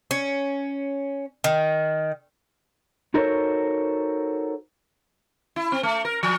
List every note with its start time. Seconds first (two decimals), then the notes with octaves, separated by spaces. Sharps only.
0.11 C#4
1.44 D#3
3.14 D#4 F#4 A4 A#4 C5 C#5
5.56 E4
5.72 C4
5.83 A3
6.05 A#4
6.23 F3